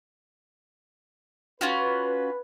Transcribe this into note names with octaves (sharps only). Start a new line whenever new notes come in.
C#4 F4 F#4 B4